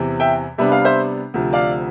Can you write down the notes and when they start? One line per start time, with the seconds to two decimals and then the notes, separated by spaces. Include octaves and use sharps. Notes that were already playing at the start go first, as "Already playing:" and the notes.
Already playing: E2 C3 E3
0.20 E5 G5
0.58 C3 G3 B3 D4 E5
0.72 F5
0.85 C5 E5
1.34 D2 C3 F3
1.53 D5 F5